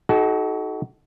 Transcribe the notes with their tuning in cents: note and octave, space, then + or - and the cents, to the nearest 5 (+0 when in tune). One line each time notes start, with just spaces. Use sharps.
D#4 +20 F#4 +25 A4 -35